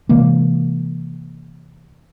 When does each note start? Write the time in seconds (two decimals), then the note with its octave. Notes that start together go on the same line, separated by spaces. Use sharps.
0.09 C3 E3 G#3 A#3